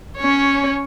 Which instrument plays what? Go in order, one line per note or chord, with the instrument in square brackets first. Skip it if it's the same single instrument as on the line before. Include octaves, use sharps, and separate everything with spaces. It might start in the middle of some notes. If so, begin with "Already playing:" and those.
[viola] C#4 C#5